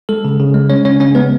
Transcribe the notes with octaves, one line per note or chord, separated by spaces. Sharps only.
G#3 A4
C#3
C#3
G#3
G#3 C#4 C#5
C#3 C#4 C#5
C#3 C#4 C#5
G#3 B3 B4